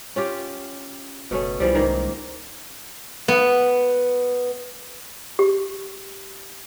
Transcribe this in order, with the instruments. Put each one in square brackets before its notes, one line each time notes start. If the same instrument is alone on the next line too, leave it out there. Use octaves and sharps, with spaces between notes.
[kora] C#4 F4 G4
[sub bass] F#1 [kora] B2 A3 C#4
[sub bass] C2 [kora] E3 F3 G3
[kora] G#2 D#3 A#3
[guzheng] B3
[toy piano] G4